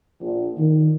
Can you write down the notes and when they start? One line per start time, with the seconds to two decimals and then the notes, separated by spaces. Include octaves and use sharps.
0.21 A#1
0.58 D#3